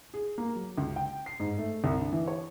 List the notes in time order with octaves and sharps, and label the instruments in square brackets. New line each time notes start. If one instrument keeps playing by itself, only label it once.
[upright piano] G#4
A#3
F#3
C#2
G5
C7
G#2
A3
C2
D4
E3
C#5